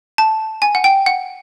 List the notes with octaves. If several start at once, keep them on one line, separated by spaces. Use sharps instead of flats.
A5
G#5
F#5
G5
F#5